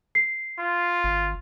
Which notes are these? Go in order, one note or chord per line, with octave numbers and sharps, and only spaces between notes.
C7
F4
G#1